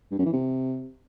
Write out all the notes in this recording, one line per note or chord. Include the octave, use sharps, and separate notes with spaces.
G2
F#2
E3
C3